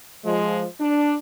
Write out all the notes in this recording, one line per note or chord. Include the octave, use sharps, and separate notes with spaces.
F3 G#3
D4